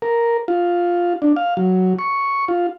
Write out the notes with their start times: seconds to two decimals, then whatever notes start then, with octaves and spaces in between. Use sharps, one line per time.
0.02 A#4
0.48 F4
1.22 D4
1.36 F5
1.57 F#3
1.99 C#6
2.48 F4